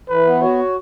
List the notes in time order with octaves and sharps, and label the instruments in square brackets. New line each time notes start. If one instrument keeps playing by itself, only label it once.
[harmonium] E3 [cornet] B4
[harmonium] B3
[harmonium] F#4 [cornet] C#5